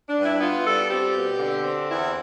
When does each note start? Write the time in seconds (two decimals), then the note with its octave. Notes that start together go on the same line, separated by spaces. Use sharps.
0.08 D4
0.16 G2
0.24 E4
0.40 B3 F4
0.66 G3 A4
0.90 C4 G4
1.15 B2
1.39 D3
1.63 C4
1.89 E2 E4